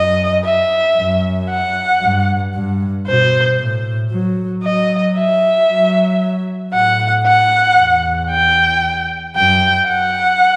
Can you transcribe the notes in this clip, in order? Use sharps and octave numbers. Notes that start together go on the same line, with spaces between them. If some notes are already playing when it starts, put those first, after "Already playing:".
Already playing: F#2 D#5
E5
F#2
F#5
G2
G2
B2 C5
A2
F#3
F#3 D#5
E5
F#3
A2 F#5
F#5
E2
G5
F#2 G5
F#5